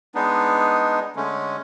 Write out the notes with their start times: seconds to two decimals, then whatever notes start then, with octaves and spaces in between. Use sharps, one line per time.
0.15 G#3 B3 D4 D#4
1.16 D3 G#3 A3 C#4